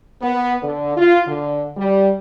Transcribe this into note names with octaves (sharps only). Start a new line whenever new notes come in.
B3
D3
F4
D3
G3